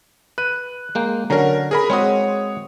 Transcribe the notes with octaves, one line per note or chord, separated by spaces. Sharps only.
B4 F#6 D#7
G#3 A#3 G5
D3 F#3 C#4 A#4 A#5
G#4 A#4 B5
G#3 C4 F#4 C#5 D#6